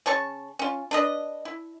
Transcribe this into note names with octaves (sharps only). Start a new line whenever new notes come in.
C#3 C#5 A5 C#6
C#4 F4
D4 B4 D#5
E4